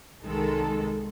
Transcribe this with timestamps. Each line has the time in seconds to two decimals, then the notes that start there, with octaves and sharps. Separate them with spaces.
0.23 C2 D#3 G#3 A4